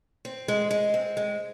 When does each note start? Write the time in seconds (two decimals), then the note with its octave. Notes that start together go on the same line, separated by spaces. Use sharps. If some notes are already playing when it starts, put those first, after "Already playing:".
0.25 C4
0.48 G#3
0.71 G#3
0.94 C4
1.17 G#3